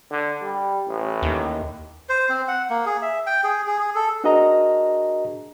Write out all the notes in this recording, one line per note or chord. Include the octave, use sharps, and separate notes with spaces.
D3
G3
A1
D#2
C5
C4
F#5
A#3
G#4
E5
G5
G#4
G#4
G#4
A4
D4 F#4 G#4 A#4 D#5 A#5